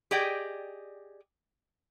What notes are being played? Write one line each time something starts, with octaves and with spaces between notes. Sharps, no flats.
G4 G#4 D5 D#5 G5